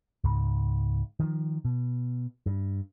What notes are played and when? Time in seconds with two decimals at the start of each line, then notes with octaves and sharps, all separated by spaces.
0.24 C#2 G#2
1.20 D#3 F3
1.65 B2
2.46 G2